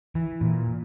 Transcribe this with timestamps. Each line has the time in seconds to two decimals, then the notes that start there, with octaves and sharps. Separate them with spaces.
0.15 E3
0.41 A#2